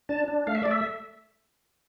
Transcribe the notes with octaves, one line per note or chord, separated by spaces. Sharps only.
D4 A5
D4
A3 F5
E5
A3 D5
E5